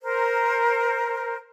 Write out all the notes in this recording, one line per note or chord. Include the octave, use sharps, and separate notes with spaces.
A#4 C5